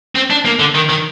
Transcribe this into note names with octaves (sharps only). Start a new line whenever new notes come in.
C4
D4
A#3
D3
D#3
D#3